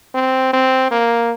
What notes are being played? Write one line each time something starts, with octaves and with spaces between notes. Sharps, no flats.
C4
C4
A#3